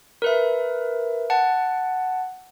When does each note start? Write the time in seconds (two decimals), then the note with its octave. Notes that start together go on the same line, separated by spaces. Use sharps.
0.22 A#4 B4 E5
1.30 F#5 A5